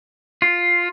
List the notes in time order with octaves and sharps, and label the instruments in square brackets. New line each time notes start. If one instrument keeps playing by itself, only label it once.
[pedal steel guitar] F4